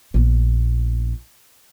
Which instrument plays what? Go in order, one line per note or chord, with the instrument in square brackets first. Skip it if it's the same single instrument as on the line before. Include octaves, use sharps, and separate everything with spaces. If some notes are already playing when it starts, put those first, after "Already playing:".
[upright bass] A#1 B3